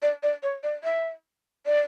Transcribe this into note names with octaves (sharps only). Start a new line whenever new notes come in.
D5
D5
C#5
D5
E5
D5